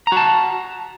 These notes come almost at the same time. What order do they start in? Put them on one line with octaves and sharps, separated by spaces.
A#5 F#4 A5